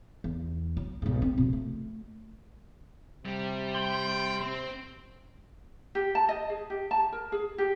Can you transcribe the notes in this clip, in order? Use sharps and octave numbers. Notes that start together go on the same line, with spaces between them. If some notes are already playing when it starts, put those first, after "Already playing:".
E2
F#3
B1 G#2
C4
B2 F3
A3
C3 G3
G5 C6
C4
G4
A5
D#5
G#4
G4
A5
A#4
G#4
G4